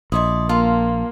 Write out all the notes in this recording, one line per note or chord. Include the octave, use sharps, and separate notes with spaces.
A#1 E4 A4 D5 D#5 C6 D#6
A#3 F4 A4 F5 A5 C6